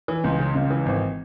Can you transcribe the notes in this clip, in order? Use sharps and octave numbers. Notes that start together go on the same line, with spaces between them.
E3
C#2
C#3
C#2
E3
G#1